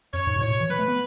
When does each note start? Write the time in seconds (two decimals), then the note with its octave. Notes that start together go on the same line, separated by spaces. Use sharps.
0.13 F#2 C#5
0.27 G#2
0.36 B2
0.41 A2 C#5
0.50 B2
0.60 E3
0.69 F#3 B4
0.79 A3
0.88 B3